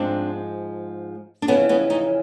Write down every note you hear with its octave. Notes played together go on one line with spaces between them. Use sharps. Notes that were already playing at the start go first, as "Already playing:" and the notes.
Already playing: G#2 F3 G#3 C4 D4
D4
F2 C#3 E3 B3 C#4
B3 C#4
C#4 D#4